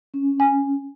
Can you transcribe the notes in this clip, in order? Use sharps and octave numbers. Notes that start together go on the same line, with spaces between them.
C#4
G#5